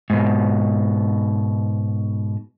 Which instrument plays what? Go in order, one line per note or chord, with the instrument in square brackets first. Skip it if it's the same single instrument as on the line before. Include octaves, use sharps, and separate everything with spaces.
[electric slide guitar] G#2 B2